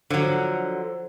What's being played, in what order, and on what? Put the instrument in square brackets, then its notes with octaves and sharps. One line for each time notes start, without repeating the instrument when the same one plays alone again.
[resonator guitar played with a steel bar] D3 F#3 [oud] F3